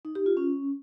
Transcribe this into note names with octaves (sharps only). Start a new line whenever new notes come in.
D#4
G4
F4
C#4